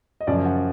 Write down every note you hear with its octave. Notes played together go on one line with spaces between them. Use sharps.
D#5
F#2 C#3 F3 D5
F#5